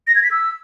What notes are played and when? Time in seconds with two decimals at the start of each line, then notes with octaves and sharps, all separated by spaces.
0.07 A#6
0.15 G#6
0.23 B6
0.31 E6